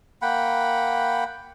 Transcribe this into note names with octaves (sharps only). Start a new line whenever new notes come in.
A#3 F#5 G5 B5